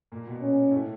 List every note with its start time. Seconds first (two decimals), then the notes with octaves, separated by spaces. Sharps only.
0.12 A#2 A#3
0.27 B2 B3
0.42 C#4
0.71 A2 A3